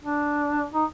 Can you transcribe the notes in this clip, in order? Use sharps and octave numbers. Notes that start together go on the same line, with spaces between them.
D4
D#4